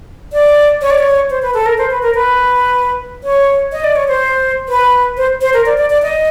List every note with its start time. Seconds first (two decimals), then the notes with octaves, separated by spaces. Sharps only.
0.33 D5
0.81 C#5
0.90 D5
0.99 C#5
1.30 C5
1.42 B4
1.54 A4
1.66 A#4
1.78 C5
1.90 B4
2.02 A#4
2.15 B4
3.24 C#5
3.72 D#5
3.84 D5
3.96 C#5
4.08 C5
4.69 B4
5.17 C5
5.41 C5
5.54 A#4
5.66 D5
5.78 D5
5.90 D5
6.03 D#5